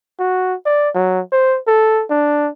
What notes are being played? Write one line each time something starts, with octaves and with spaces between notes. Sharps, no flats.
F#4
D5
F#3
C5
A4
D4